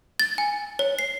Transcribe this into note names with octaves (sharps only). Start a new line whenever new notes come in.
A6
G#5
C#5
C7